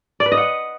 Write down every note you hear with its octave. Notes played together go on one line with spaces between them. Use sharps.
D5
B4
D#5
F#5